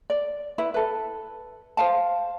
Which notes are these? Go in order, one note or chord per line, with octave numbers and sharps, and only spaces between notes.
D5
E4 B4
A4 B4
C5 F5 A5